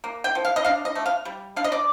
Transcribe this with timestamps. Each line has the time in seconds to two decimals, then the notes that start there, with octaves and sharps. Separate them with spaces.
0.04 A#3
0.24 G5
0.35 F3
0.45 F5
0.56 D#5
0.65 D4 F5
0.85 D#5
0.95 A3
1.06 F5
1.25 G3
1.56 D4 F5
1.64 D#5
1.72 D5